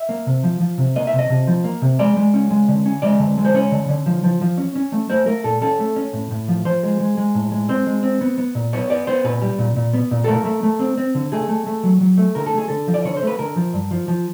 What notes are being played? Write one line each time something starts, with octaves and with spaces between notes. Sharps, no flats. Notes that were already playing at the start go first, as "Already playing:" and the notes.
Already playing: E5
A#3
C3
F3
F3
C3
A#3 D#5
E5
C3
D#5
C3
F3
A#3
C3
G#3 D5
G#3
C#4
G#3
D3
C#4
G#3 D5
D3
G#3
C5
C#4 C#5
D3
D3
F3
F3
F3
C#4
C#4
A3
A3 C5
A3 A#4
A#2 A4
C#4 A4
A3
C#4
A2
A2
F3
F3 C5
G#3
G#3
G#3
A2
G#3
C4 C5
G#3
C4
B3
B3
A#2
B3 C#5
B3 D5
B3 C5
A#2 B4
G3
A#2
A#2
B3
A#2
A4
A3 A#4
A3
A3
C4
C4
D3
A3 G#4
A3
A3
F#3
F#3
A3
D3 A#4
A4
A3 G#4
D3 A4
F3
D5
D3 C#5
C5
A3 B4
D3 A#4
F3
G2
F3
F3